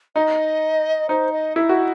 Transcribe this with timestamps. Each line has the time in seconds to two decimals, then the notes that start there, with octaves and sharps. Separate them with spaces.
0.15 D#4 D#5
1.09 D#4 C5
1.32 D#5
1.56 E4 E5
1.69 F#4